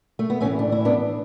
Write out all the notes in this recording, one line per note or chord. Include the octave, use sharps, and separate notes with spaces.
A3
B3
A2 E3 A3 C#4
D4
E4
B3 D4